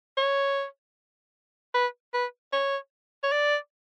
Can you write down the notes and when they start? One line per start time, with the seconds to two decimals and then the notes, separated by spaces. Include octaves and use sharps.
0.17 C#5
1.74 B4
2.14 B4
2.53 C#5
3.23 C#5
3.32 D5